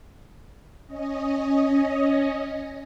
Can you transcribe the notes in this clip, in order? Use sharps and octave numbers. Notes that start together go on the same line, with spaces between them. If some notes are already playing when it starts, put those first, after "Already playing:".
C#4 D#5